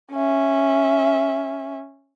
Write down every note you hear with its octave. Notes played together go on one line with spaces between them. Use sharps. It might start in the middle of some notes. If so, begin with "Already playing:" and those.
C#4 E5